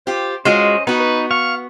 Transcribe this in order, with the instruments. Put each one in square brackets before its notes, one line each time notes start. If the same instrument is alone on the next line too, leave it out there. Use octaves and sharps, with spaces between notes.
[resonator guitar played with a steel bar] F4 G4 [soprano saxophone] C5
[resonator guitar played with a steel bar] G#3 F4 F#4 [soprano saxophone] C#4 [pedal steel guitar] C5 D#5
[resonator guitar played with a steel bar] B3 F#4 [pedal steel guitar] D#4 [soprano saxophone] B4
[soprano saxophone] B4
[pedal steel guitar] F5 [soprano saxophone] C#6